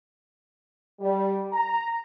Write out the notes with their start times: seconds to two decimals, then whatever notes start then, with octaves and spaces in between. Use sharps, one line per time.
1.00 G3
1.52 A#5